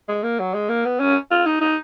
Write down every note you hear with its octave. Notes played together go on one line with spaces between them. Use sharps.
G#3
A#3
F#3
G#3
A#3
B3
C#4
F4
D#4
D#4